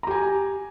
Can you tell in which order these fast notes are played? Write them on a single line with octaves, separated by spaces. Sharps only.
A#5 G4 G#5